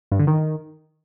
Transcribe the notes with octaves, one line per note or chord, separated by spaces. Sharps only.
G2
D3
D#3